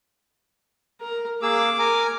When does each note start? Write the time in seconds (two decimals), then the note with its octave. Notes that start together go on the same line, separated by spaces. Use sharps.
1.01 A#4
1.42 A#3 G#4 D6 E6
1.79 A#4 G#5